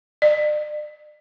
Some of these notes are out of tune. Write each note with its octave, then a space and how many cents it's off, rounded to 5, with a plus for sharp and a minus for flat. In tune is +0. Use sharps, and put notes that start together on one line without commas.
D5 +40